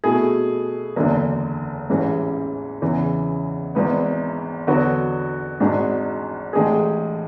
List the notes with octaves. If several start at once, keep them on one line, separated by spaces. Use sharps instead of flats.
B2 A3 E4 G#4
F#1 E2 D3
A1 G#2 E3 G#3 C#4
E2 C#3 E3
G#1 G#2 E3 B3
E2 D3 F#3 B3 F#4
G#1 G#2 G#3 D4 F#4
A1 A2 G#3 D4 G#4